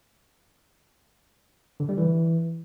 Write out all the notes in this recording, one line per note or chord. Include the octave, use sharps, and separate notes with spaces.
D3
G3
E3